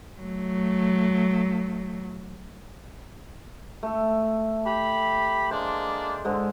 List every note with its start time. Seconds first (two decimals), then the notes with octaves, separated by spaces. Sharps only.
0.21 F#3 A3
3.83 A3 A4
4.65 G4 B5
5.51 G#3 A#3 D4 C5
6.25 G#2 D3 G#3